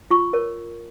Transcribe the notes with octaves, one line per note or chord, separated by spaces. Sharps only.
F4 C#6
A#4 C#5